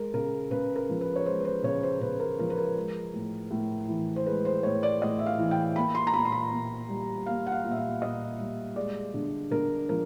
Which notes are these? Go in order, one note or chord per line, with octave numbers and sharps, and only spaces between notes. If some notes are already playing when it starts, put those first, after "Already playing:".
Already playing: G#3 A#4
C#3 A#4
C#3 B4
A#4
F3
B4
C#5
G#3 C5
B4
C5
C#3 C#5
C5
C#3 B4
A#4
F3 A#4
B4
A#4
G#3
A2
A2
E3
C5
G#3 B4
C5
A2 C#5
D5
A2 D#5
E5
F5
E3
G5
A#3 B5
C6
A#5
A#2 B5
C6
B5
A#2
G3
A#3 F5
F#5
F5
A#2
E5
F5
A#2 D#5
G3
G#3 D5
D3
D3 A#4
F3 A#4